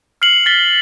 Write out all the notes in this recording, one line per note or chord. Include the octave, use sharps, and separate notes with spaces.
F6 C7 C#7 F#7
A6 B6 G7